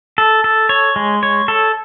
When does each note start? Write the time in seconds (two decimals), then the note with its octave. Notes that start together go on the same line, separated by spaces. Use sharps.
0.18 A4
0.44 A4
0.69 C#5
0.96 G#3
1.23 C#5
1.48 A4